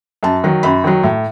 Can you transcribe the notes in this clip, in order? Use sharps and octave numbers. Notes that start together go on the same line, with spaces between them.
F#2 A5
D#3 F#3
F#2 B5
D#3 F#3
A2